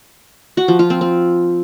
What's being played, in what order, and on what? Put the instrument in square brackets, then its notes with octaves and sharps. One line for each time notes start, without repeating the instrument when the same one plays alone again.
[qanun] F#4
F3
F4
C4
C4